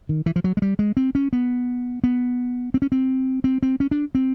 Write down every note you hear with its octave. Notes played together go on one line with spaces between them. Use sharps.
D#3
E3
F3
F#3
G#3
G3
G#3
C4
C#4
B3
B3
C4
C#4
C4
C4
C4
C#4
D4
C4